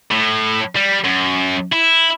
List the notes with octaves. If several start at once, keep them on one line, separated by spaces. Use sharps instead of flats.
A2
G3
F#2
E4